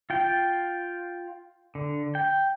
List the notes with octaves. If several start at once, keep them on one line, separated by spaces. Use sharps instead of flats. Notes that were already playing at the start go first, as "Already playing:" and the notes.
F4 G5
D3
G5